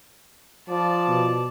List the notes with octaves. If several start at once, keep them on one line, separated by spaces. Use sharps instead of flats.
F3 D5 A5
B2